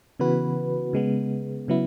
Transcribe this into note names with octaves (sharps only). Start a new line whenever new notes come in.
C#3 E3 B3 F#4 B4
C#3 G#3 B3
C#3 F#3 B3 E4